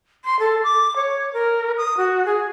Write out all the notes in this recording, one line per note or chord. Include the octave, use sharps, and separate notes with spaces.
C6
A4
D6
C#5
A#4
D#6
F#4
G#4